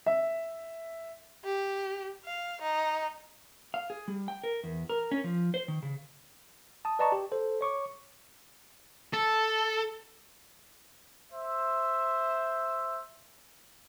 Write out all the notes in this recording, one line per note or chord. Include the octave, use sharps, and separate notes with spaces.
E5
G4
F5
D#4
F5
G#4
G3
G5
A#4
E2
A#4
C#4
F3
C5
D#3
C#3
A5 D#6
B4 D5 D#5 A5 A#5 C#6
G4
A4 C5
C#5 C#6 D6
A4
C5 E5